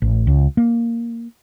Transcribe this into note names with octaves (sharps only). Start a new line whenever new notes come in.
A1
C#2
A#3